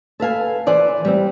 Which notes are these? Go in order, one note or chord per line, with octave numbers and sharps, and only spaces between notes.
A4 B4 F5 G#5
E3 C5 D5 G#5
G3 C4